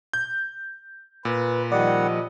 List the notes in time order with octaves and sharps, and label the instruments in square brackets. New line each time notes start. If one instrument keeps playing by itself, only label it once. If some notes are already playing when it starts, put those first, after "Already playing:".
[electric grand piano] G6
[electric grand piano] A#2 [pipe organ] B4
[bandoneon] D#3 G3 F#5 [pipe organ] F3 D#5 [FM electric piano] D5